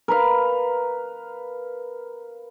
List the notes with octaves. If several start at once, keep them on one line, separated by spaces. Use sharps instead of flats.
A#4 B4 F5